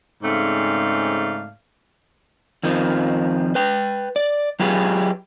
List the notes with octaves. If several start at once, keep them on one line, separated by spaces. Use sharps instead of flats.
G#2 C#3 A3 C4 D5 F5
F2 D#3 F3
B4 G5
D5
F#3 F4 G4 G#4 B4